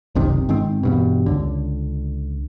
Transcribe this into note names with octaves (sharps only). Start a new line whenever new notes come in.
F#1 C2 C3 D#3
G#2 D#3 C4
E2 G2 B2
C#2 D3